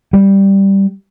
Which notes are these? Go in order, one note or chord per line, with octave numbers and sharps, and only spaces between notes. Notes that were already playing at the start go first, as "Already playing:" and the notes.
G3